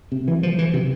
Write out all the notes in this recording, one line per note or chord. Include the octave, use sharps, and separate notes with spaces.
C3
E3
F3
E3
C3